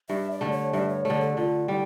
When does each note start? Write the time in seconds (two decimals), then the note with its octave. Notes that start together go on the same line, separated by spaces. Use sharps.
0.09 G2 E5
0.31 D5
0.41 D3 A3
0.52 C#5
0.73 G2 E5
0.89 C#5
1.05 D3 A3 C#5
1.21 A4
1.37 D3 F4
1.68 G3 E4